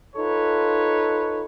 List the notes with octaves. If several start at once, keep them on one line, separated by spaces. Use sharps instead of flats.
D#4 F4 A4 B4 C#5